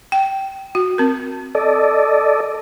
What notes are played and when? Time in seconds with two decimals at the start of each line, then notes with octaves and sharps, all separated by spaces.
0.12 G5
0.75 F#4
0.98 C4 A#4
1.55 A4 D5 D#5